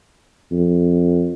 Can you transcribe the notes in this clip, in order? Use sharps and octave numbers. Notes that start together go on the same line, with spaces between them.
F2